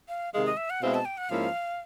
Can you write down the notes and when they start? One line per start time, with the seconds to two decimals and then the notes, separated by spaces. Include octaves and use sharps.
0.09 F5
0.33 C3 D#3 G#3 F5
0.45 D#5
0.57 E5
0.70 F#5
0.81 B2 G#3 C4 E4 F5
0.94 A5
1.05 G5
1.17 F#5
1.29 G#2 F3 A#3 C#4 E4 F5